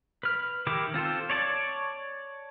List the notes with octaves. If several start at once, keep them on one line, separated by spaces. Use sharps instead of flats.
B4 F6
D#3 E4 G4 A#4 D6
C4 F4 A4 C5
C#5 D5 A5